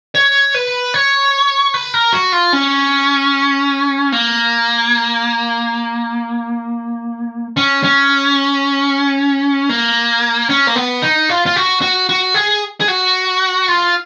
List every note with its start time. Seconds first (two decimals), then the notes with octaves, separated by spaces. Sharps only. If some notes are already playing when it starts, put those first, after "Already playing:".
0.15 C#5
0.54 B4
0.94 C#5
1.74 B4
1.94 A#4
2.13 F#4
2.32 F4
2.53 C#4
4.12 A#3
7.57 C#4
7.83 C#4
9.69 A#3
10.49 C#4
10.67 A#3
10.76 B3
11.02 D#4
11.29 F4
11.46 F4
11.56 F#4
11.81 F#4
12.09 F#4
12.34 G#4
12.80 G#4
12.88 F#4
13.68 F4